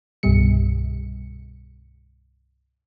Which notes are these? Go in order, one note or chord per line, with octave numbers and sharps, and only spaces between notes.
C2 G2 B2 G3 C#7